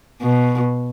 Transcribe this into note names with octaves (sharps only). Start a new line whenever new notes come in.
B2